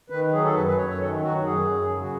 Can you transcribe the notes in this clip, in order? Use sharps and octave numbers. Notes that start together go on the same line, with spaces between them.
D#3 B4
F#3 G#4
A4
F#2 B4
B4
F#2 C#5
C#5
D#3 A4
F#3 F#4
F#2 G#4
F#2
C#3
F#4